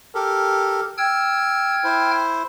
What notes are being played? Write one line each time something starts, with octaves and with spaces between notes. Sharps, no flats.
G4 A4 A#4
G5 E6 F6 G#6
E4 C5